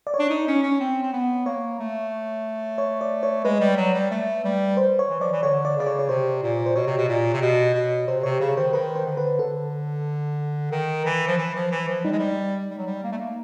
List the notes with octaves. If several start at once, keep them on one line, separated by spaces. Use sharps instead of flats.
D5
C#5
D4
D#4
C#4
C#4
C4
C4
B3
A#3 C#5
A3
C#5
D5
C#5
G#3 B4
G3
F#3
G3
A3
G3
C5
C#5
E3
F3 D5
E3
D3 C#5
D5
C#3 D5
C#5
C#5
C3 C5
A#2
C5
B2 C#5
C3
B2
A#2
C3
B2
B2
C3 C5
C3 C#5
C#3 C#5
D#3 C5
D#3 B4
C5
D3
B4
D3 A4
D#3
E3
F3
E3
F3
E3
F3
G3 D#4
G#3
G3
G3
F#3
G3
A#3
A3
A#3